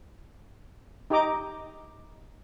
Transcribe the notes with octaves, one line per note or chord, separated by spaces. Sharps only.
D#4 G4 D#5 A#5 D6